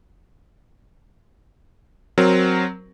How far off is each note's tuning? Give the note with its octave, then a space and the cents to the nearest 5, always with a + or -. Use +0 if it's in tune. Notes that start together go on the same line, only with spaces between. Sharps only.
F#3 +0 C4 +5 A#4 +0